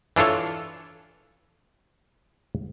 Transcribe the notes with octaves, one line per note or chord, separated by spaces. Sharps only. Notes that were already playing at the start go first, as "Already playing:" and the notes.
E3 D4 F4 A4 C#5